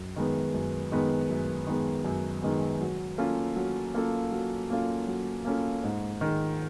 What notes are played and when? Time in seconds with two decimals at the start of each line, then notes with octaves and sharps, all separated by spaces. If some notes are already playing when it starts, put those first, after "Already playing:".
Already playing: F#2
0.16 D#3 G#3 B3
0.54 F#2
0.92 D#3 G#3 B3
1.29 F#2
1.67 D#3 G#3 B3
2.04 F#2
2.42 D#3 G#3 B3
2.81 F#3
3.18 A#3 C#4 F4 A4
3.56 F#3
3.94 A#3 C#4 F4 A4
4.32 F#3
4.70 A#3 C#4 F4 A4
5.07 F#3
5.45 A#3 C#4 F4 A4
5.83 G#2
6.21 D#3 G#3